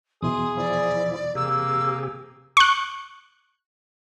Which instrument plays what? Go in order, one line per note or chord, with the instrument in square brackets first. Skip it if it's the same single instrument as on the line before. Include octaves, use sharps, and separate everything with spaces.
[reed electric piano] E2 B2 E3 [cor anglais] G#4 [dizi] C6 [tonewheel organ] D#6
[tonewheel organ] F3 E4 [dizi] D5
[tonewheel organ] C3 G4 G#4 [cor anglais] A#3 [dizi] E6
[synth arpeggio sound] C#6 F#6